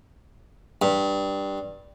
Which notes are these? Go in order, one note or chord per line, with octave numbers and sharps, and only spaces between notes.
G2